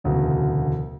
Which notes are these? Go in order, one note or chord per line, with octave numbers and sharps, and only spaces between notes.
E1 D2 C#3 F#3 B3